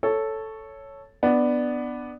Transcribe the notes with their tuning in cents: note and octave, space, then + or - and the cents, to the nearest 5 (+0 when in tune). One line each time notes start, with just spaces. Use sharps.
A4 +0 C#5 +0
B3 +0 D4 +10